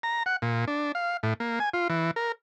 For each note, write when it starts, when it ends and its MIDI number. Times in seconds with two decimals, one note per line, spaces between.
0.03 0.23 82
0.26 0.36 78
0.42 0.65 46
0.68 0.92 62
0.95 1.17 77
1.23 1.34 45
1.40 1.59 58
1.60 1.69 80
1.74 1.88 65
1.90 2.11 52
2.16 2.32 70